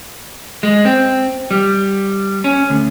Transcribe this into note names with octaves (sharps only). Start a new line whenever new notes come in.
G#3
C4
G3
C#4
D2